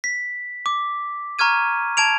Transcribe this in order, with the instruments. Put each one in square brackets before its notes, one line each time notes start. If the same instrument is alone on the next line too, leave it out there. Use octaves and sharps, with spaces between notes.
[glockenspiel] B6
D6
A#5 C#6 F6 G#6 D#7
A5 G#6 D7 F7